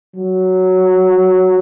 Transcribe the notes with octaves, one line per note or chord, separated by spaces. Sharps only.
F#3